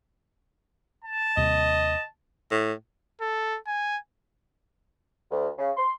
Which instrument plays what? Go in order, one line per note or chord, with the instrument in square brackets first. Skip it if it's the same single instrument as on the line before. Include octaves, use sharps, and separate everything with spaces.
[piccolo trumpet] A5
[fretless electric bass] D#2 C3 G3 [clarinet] D#5
[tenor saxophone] A2
[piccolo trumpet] A4
G#5
[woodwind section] D2
C#3
C6